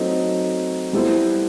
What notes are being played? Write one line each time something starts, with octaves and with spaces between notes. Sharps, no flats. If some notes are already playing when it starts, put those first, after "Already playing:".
Already playing: F#3 A3 C4 D#4
G3 B3 E4 A4 C5